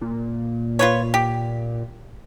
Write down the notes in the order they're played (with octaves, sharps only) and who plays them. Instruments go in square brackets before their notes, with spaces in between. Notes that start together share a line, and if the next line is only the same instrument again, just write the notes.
[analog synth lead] A#2
[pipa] F4 B4 C#5
G4